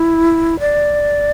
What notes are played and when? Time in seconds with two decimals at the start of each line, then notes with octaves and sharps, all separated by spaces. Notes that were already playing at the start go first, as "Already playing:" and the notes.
Already playing: E4
0.60 D5